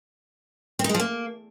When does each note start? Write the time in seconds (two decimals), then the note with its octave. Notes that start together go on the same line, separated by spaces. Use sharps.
0.79 C4
0.84 D#4
0.89 G#3
0.94 F3
1.00 A#3